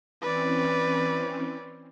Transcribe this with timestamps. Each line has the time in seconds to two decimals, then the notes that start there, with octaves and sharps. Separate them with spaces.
0.22 E3 C4 C#4 B4 D5